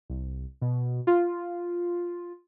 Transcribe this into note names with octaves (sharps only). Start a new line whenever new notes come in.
C2
B2
F4